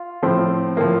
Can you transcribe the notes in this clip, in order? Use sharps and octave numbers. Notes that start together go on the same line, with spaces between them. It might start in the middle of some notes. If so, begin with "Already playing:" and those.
Already playing: F4
A2 F3 C4
A2 F3 A#3